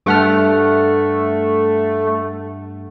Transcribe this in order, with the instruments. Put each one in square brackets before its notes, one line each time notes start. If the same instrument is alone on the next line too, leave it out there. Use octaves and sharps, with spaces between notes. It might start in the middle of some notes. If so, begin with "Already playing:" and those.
[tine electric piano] G2 F#5 F6 [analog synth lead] A3